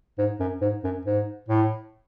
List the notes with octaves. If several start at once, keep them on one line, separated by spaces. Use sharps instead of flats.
G#2
F#2
G#2
F#2
G#2
A2